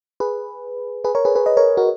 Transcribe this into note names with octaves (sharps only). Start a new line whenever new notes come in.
G#4 B4
G#4 B4
A#4 C#5
G#4 B4
G#4 B4
B4 D#5
A#4 C#5
F#4 A#4